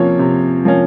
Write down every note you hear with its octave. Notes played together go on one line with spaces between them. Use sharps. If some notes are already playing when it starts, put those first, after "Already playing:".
Already playing: C3 F3 A#3 C#4 C#5
C3
F3 A#3 C#4